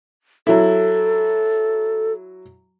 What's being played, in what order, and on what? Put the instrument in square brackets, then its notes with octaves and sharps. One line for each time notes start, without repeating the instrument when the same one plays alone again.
[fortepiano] F#3 E4 [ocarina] A4